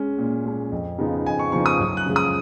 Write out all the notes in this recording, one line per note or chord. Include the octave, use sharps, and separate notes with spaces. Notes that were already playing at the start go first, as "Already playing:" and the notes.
Already playing: G#3 C#4
A#2
G#3 C#4
F2
C#3 F3 B3 D#4
F2 G#5
C#6
C#3 F3 B3 D#4 C#6
D#6
F#2
F#6
C#3 F3 G#3
D#6